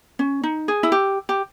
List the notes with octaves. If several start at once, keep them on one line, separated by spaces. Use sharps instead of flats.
C#4
D#4
G#4
E4
G4
G4